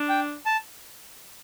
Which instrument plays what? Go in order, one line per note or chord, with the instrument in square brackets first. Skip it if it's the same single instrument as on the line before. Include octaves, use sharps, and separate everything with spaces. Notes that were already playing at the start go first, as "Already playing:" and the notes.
Already playing: [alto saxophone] D4
[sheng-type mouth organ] G5
A5